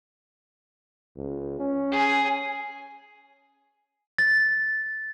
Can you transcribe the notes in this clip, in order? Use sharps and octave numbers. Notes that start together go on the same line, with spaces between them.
C#2
C#4
G#4 G#5
A6